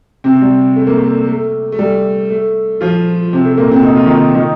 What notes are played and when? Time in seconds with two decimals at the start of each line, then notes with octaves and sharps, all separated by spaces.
0.24 C3 C4
0.42 G3
0.76 A3
0.87 A#3
0.98 A3
1.28 A3
1.72 A3
1.79 G3
2.30 A3
2.81 F3 F4
3.33 C3 C4
3.45 A3
3.58 A#2 A#3
3.71 C3 C4
3.83 D#4
3.95 F4
4.06 D#3 D#4
4.34 D#3 D#4